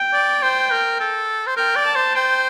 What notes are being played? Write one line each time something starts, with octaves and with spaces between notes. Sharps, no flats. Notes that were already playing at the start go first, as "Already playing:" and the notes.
Already playing: G5
D5
C5 G5
A#4
A4
C5
A#4 G5
D5
A5
C5
C5 G5